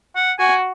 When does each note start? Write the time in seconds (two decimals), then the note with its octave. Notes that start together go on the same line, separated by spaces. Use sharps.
0.16 F#5
0.39 F#4 G#5